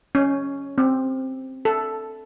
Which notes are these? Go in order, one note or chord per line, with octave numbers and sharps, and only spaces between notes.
C#4
C4
A4